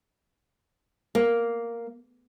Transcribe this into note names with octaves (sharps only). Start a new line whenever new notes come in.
A#3